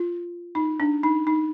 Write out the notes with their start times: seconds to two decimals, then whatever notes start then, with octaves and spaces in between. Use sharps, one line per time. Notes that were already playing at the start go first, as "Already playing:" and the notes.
Already playing: F4
0.55 D#4
0.80 D4
1.04 D#4
1.27 D#4